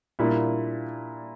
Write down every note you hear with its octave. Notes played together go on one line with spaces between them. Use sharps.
A#2 G3 A#3 D4 E4